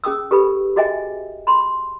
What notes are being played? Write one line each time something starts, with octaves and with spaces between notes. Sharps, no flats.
C#4 G#4 G5 D#6 E6
G4 A4 B4 B5
F#4 G#4 D#5 E5 G5 G#5
B5 C6